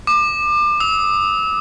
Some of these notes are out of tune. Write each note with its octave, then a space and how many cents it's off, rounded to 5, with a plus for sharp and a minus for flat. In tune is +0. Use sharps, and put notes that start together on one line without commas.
D6 +30
E6 -35